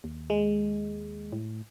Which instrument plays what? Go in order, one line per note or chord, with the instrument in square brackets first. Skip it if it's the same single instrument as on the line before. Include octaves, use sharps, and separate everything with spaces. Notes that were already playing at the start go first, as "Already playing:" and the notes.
[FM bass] D#2
[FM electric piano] G#3
[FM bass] A2